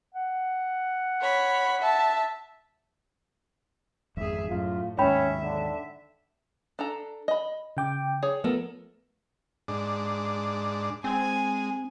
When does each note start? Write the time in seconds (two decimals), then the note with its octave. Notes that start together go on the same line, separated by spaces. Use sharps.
0.15 F#5
1.21 C#5 B5
1.81 E5 A5
4.17 G#1 F2 G#2 G#4 E5
4.50 F#2 A2 F4
4.98 D#2 G#2 C#4 C#5 E5 G5 B5
5.43 D3
6.79 D4 A4 A#5
7.28 D#5 B5
7.77 C#3 G5 D6
8.23 G#4 C#5
8.44 F3 A3 B3 A4 A#4
9.68 G#2 D4
11.04 G#3 C4 G#5